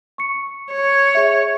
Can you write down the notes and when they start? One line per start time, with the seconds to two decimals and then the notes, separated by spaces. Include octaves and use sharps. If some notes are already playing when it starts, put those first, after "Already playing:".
0.18 C#6 C#7
0.71 C#5
1.15 G#4 E5